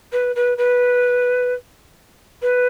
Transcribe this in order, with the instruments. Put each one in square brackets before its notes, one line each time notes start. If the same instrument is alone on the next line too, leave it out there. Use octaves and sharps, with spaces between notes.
[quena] B4
B4
B4
B4